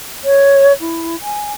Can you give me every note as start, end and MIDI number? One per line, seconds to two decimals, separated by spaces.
0.24 0.73 73
0.81 1.16 64
1.22 1.52 80